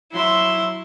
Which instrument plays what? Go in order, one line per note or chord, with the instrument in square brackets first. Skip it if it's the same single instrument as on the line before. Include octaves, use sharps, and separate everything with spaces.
[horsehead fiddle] F#3 E5 [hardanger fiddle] E4 C6